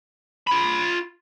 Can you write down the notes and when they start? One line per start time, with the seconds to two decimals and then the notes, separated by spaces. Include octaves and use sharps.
0.47 F4 B5